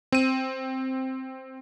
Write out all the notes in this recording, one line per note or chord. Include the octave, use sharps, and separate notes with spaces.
C4 D#7